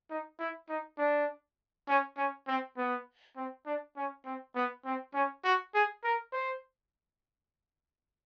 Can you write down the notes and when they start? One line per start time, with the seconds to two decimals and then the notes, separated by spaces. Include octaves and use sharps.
0.10 D#4
0.39 E4
0.69 D#4
0.98 D4
1.88 C#4
2.17 C#4
2.48 C4
2.77 B3
3.36 C4
3.66 D4
3.96 C#4
4.25 C4
4.55 B3
4.85 C4
5.14 C#4
5.44 F#4
5.74 G#4
6.04 A#4
6.32 C5